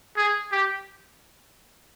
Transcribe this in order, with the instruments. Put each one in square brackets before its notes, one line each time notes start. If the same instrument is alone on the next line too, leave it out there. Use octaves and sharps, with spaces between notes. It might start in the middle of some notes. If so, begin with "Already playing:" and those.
[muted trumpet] G#4
G4